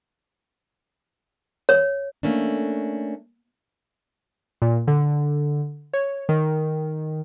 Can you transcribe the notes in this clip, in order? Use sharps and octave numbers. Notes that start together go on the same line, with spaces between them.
C#5
A3 A#3 C#4 D4
A#2
D3
C#5
D#3